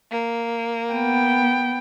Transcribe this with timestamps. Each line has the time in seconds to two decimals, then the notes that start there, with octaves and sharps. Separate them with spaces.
0.11 A#3
0.94 B3 G5